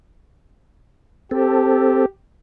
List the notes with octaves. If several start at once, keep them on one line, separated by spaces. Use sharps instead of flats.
C4 G4 A4